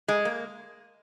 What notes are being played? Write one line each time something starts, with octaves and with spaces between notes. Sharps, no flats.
G#3
A#3